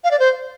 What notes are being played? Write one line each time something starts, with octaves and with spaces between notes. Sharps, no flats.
F5
D5
C5